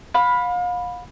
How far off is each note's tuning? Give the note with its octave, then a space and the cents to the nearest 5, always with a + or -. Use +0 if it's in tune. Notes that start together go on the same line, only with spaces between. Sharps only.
F5 +35 B5 +0